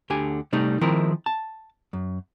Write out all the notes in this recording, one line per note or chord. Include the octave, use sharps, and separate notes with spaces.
D2 D3 G4 G#5
C3 G3 A3 D#4
D#3 F3 G#3 C4 E4 A#4
A5
F#2